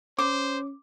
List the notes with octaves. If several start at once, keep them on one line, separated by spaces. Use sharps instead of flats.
C#4 C5 D6